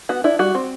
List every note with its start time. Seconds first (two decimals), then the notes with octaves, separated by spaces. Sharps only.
0.09 B3 F#4
0.24 D4 E4
0.39 G3 F#4
0.55 C4